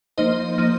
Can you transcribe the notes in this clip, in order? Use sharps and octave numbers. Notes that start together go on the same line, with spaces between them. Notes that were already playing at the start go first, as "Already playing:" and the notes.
F3 A#3 D#4 C5 D#5
F3 A#3 D#4